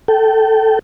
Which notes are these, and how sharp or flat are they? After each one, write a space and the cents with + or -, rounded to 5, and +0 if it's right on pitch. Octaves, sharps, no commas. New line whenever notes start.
A4 +0 G5 -20